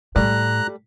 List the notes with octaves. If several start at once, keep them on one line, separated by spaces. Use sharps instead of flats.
A2 G3 A3 A#5 F#6